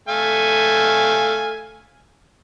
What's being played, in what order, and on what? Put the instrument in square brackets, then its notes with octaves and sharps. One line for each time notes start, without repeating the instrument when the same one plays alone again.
[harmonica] A3 F5 G#5